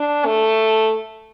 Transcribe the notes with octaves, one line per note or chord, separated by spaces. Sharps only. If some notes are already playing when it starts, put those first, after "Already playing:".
Already playing: D4
A3